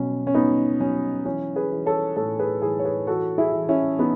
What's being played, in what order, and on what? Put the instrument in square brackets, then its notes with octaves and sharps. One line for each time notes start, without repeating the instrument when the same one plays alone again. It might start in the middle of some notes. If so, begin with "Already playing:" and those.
Already playing: [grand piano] B2 F#3 B3 C#4
C#4
B2 B3 D#4
F#3 C#4
E3 C#4
G#4 B4
E3
A4 C#5
A2 A4 C#5
G#4 B4
E3 G#4 B4
C#5
G#4 B4
E3 F#4 A4
E4 G#4
E3
C#4 E4
E3 B3 D#4